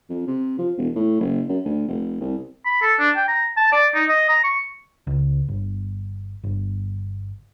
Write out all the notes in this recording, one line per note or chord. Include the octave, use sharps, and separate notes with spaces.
F2
C3
F3
E1
A2
F#1
F#2
D2
F1
C2
B5
A4
D4
G5
A#5
A5
D5
D#4
D#5
A#5
C#6
C#2
G1
G1